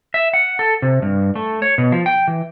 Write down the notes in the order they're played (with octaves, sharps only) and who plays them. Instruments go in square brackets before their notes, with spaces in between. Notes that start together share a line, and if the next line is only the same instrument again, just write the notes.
[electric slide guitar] E5
F#5
A4
C3
G2
A3
C#5
B2
F3
G5
E3